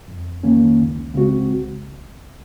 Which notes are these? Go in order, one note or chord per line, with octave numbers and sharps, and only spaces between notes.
F2
D#3 A#3 C#4
C#2
C#3 G#3 C4 F#4
C2